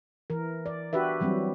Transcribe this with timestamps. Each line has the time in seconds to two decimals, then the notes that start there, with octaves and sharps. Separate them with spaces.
0.30 E3 A#4
0.66 D5
0.93 D4 F#4 G4 B4 E5
1.20 E3 F#3 G3 C4